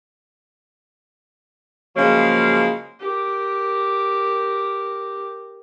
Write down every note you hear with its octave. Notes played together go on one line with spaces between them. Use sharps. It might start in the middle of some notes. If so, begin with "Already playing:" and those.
C#3 F3 F#3 G#3 A#3
G4 A#4